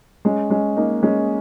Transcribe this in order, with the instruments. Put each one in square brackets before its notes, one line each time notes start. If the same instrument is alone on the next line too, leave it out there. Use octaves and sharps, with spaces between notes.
[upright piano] G#3 C#4
G#3 C#4
A#3 D#4
G#3 C#4